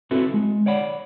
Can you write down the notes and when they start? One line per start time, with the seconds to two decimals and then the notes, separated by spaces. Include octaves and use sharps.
0.11 C4 E4 F#4 A4 B4
0.34 G#3
0.66 C#5 D5 F#5 B5